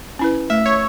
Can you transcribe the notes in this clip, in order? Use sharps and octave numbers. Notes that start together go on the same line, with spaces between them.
C#4 E4 B4
A3 E5
C#5